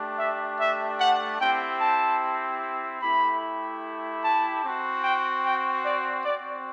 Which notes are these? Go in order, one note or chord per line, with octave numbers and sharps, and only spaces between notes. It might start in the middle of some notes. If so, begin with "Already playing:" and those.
Already playing: A3 D4 G4
E5
E5
F#5
C4 E4 G4 G5
A5
A3 E4 G4 B5
A5
C4 F#4
G5
G5
D5
C4 F#4 D5